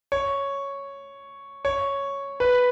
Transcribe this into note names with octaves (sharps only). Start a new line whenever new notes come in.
C#5
C#5
B4